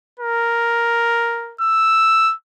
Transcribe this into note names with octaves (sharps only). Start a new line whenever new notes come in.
A#4
E6